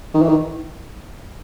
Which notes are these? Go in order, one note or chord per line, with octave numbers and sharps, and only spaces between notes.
D#3
E3
D#3